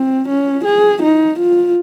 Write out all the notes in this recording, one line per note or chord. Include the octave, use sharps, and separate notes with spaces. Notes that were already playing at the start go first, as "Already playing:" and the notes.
Already playing: C4
C#4
G#4
D#4
F4